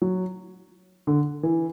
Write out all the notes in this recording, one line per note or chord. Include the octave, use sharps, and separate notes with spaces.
F#3
D3
E3